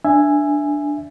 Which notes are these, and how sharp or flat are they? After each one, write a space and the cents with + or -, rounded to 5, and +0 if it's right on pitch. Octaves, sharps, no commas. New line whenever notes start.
D4 +0 E5 +10 G#5 -5